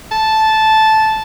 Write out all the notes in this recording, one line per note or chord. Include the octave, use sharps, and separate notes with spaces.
A5